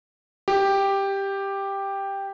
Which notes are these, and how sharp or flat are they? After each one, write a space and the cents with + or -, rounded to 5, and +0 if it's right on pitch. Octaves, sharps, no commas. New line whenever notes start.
G4 +5